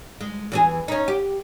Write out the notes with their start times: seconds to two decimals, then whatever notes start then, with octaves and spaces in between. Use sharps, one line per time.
0.21 G#3
0.52 E2 E3 G#4
0.88 C#4 D#4
1.08 G4